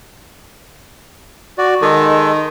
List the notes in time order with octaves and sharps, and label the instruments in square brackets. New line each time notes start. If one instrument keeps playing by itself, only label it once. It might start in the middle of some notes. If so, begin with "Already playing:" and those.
[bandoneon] F#4 D5
[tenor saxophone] D#3 [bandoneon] G#3 A4